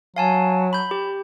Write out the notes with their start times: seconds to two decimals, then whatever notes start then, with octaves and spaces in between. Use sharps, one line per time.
0.16 F#3 F5 G#5 A5
0.73 B5 G6
0.91 G4